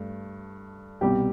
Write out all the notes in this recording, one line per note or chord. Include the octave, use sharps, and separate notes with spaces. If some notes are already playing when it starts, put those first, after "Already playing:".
Already playing: G2 A3
C2 B2 G3 G4